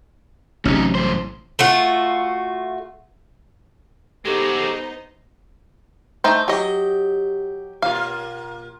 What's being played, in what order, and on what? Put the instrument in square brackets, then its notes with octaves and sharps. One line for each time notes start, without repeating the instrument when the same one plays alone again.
[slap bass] A1 C3 F#3 [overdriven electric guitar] C#4 D#4
[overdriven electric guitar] G2 C5
[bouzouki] A3 F4 F#4
[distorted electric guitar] G#3 F#4 [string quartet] B3 D#4 C5 [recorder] G4 [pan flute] A4
[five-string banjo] A3 D#4 C5
[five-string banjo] F#3 D#5 [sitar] G4
[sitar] B2 A#3 F4 [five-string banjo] F5